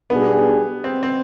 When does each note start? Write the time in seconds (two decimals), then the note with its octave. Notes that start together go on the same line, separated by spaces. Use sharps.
0.10 B1 B2 G3 B3 D4 G#4
0.84 C4
1.03 C4